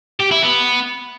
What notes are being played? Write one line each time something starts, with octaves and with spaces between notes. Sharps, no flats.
G4
E4
B3